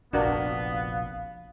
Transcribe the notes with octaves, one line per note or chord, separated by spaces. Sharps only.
F1 A#1 F2 B3 D4 F#4 A#4 F5